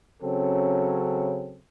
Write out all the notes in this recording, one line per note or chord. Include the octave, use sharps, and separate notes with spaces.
C#3 F#3 C4 C#4 A4